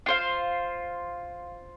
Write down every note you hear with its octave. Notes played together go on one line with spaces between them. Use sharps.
F4 C5 F5